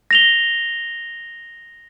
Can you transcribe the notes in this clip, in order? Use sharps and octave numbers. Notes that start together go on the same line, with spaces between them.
A#6 F7 G7